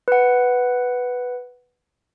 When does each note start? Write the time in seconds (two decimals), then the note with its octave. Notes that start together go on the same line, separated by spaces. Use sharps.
0.08 B4 F#5